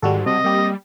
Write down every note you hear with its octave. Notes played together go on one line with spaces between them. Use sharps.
G#2 D#3 G3 F#4 A4
C3 C4 D#5
G3 A#3 G4